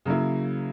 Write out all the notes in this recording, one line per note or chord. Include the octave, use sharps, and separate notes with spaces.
C#3 F#3 A#3 E4